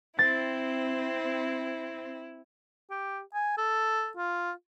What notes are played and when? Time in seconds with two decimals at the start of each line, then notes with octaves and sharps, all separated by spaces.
0.19 C4 E4 A6
2.90 G4
3.34 G#5
3.58 A4
4.17 F4